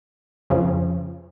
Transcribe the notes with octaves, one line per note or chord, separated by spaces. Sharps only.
F2 C#3 F3